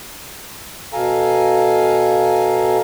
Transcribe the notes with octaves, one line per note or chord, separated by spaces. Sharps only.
B2 A4 F5 G#5 A#5